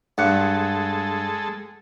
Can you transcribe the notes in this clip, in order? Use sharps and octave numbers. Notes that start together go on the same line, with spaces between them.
G2 G#3 A4 F#5 F#6 C#7